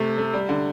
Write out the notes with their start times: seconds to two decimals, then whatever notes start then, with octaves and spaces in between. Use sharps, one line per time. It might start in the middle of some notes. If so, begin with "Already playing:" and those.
Already playing: C3 A3
0.18 A3
0.34 G3
0.49 D3